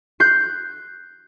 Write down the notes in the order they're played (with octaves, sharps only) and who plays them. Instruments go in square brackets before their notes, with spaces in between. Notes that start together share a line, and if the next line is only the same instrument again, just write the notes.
[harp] F#6 G6 C7